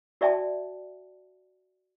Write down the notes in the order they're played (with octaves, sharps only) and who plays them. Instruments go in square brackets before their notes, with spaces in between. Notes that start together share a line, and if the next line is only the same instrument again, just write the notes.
[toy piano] F#4 D5 E5 G5 A5